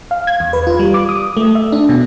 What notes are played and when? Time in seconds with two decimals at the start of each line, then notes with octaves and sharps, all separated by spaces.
0.11 F5
0.27 G#6
0.40 E2
0.53 B4
0.67 F4
0.79 G3
0.94 D6
1.09 D#6
1.37 A3
1.55 E5
1.72 D4
1.89 B2